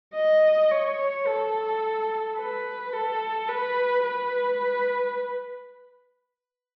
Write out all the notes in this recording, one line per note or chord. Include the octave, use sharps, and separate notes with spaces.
D#5
C#5
A4
B4
A4
B4
B4